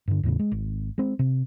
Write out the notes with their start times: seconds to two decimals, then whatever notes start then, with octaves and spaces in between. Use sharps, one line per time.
0.08 G2 D3
0.23 E2 A2 C#3
0.39 G#3
0.52 G#1
0.98 G#3 C4
1.19 C3